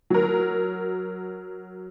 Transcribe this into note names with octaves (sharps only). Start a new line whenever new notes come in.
F#3 A#4